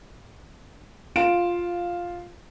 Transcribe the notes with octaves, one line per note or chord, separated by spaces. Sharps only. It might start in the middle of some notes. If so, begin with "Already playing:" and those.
F4 F5 D7 E7